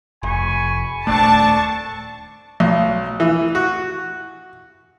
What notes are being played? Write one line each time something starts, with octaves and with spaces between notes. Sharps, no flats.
F1 G#5 B5 C#6
D#1 E2 A3 C4 D4 A5 C#6
B1
E3
F#4